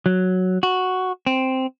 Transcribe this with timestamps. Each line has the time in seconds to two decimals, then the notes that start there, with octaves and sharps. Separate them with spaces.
0.06 F#3
0.63 F#4
1.27 C4